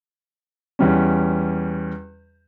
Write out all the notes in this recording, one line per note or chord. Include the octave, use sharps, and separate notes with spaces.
E2 G3 C#4